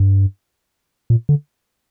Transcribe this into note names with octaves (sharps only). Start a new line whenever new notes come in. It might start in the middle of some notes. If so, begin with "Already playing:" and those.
Already playing: G2
A#2
D3